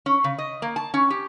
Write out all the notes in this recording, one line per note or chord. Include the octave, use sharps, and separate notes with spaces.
C#4
C#3
D#5
A#3
A5
C#4
G4